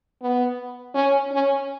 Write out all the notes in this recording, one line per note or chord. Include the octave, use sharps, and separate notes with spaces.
B3
C#4
C#4